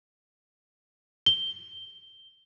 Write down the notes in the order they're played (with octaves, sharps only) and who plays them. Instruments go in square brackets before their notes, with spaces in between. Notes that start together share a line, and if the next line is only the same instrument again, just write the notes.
[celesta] G7